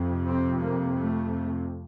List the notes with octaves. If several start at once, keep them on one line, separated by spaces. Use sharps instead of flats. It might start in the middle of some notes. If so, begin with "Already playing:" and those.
Already playing: F2 C3
C4
A#3
A3